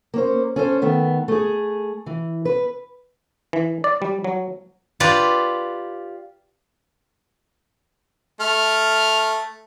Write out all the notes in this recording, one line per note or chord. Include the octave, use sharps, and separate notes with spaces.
A#3 C#4 C5
C#4 A4 C5
D#3 A3 B3
A3 G#4
E3
B4
E3
D5
G3
F#3
F4 G4 B4 D5
A3 F6